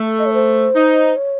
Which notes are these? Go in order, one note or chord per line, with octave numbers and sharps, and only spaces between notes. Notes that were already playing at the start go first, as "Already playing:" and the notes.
Already playing: A3
D#5
C#5
C5
D#4
C#5